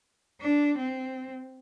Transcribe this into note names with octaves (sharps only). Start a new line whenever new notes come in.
D4
C4